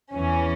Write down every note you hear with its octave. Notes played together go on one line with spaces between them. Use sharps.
E2 E3 C#4